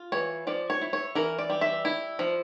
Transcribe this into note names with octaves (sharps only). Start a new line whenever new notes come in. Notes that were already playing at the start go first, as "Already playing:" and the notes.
Already playing: F4
E3 C#5
F3 D5
C#5
E4
C#5
E3 A#4
D5
G3
E5
E4
F3